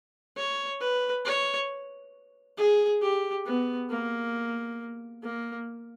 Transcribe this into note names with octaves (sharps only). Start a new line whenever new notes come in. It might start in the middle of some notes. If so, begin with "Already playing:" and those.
C#5
B4
C#5
G#4
G4
B3
A#3
A#3